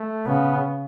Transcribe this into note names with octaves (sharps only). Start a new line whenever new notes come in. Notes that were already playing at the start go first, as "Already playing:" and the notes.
Already playing: A3
C#3 B3